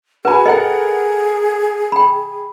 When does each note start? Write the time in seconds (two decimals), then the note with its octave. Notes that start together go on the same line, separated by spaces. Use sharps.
0.25 F#4 G#4 B4 G#5 B5
0.46 A4 A#4 D#5 F#5 G5
1.92 G5 B5